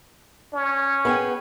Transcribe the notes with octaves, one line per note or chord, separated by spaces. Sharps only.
C#4
B3 G#4 G5